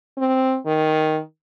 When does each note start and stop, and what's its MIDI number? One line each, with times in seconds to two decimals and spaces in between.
0.18 0.57 60
0.66 1.20 51